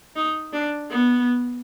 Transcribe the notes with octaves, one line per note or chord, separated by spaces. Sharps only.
D#4
D4
B3